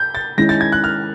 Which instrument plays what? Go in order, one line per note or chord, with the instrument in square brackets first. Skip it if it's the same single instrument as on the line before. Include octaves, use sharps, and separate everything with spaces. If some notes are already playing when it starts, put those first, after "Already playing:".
Already playing: [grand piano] G6
A6
[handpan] D#3 G#3 C#4 E4 [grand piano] A#6
[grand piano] A6
G#6
F#6
F6